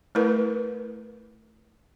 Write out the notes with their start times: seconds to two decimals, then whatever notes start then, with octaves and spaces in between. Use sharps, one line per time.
0.15 A3 E4 A#4 B4